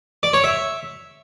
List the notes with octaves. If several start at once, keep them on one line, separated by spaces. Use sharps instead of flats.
D5
C#5
E5